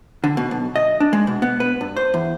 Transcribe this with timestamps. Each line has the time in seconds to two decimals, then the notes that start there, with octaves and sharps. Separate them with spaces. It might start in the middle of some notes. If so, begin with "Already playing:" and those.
0.24 D3
0.37 B2
0.51 B1
0.76 D#5
1.00 D4
1.13 G#3
1.27 B2
1.42 B3
1.60 B4
1.81 G2
1.97 C5
2.14 E2